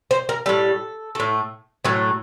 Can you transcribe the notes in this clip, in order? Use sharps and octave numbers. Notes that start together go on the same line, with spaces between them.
C5
A#4
A2 G3 A4
A2 A3
A2 F#3 A3